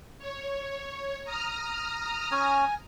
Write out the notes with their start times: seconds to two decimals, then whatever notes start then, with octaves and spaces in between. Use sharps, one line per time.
0.19 C#5
1.24 A#5 D#6 F6
2.31 C#4 G#5